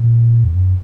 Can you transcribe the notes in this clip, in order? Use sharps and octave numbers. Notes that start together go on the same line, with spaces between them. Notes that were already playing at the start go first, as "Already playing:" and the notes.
Already playing: A#2
E2
F#2